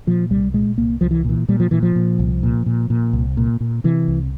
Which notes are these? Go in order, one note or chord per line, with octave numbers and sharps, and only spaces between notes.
A#2 F3
C2 G3
A#2 G#3
C2 A#3
C2 F3
E3
A#2 E3
A#2 G3
F3
A#2 E3
F3
A#2
C2
A#2
A#2
A#2
C2
A#2
A#2
C3 E3
C2